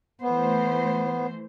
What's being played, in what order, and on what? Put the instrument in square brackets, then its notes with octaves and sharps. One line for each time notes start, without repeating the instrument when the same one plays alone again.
[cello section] E3 A3 C5 [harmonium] B3